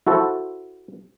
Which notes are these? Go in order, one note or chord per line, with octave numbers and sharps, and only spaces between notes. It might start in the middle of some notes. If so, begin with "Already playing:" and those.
E4 F#4 A4 C5